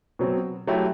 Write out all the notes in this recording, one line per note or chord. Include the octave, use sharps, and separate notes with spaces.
B2 F#3 C4
F#3 A3 E4 G4